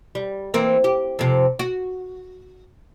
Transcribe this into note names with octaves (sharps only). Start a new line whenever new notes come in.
G3
E3 A#3 C4
G4
F2 C3
F#4